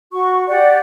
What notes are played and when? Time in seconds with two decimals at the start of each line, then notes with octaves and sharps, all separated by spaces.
0.12 F#4 C#6
0.48 G4 D5 F#5